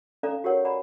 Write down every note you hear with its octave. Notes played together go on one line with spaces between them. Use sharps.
C#4 A4 D5 F5 A#5
F#4 G4 A#4 C#5 F#5
D5 F#5 G#5 A#5 B5